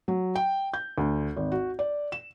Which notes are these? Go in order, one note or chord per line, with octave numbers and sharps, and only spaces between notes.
F#3
G5
G6
D2
G#1
F#4
D5
E7